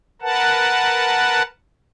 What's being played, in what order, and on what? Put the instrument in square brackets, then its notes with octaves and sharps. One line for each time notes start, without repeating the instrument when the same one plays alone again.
[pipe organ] A#4 B4 F#5 A5